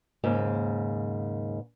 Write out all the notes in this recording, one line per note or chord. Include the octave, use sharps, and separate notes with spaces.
D#2 G#2 C#3 A#3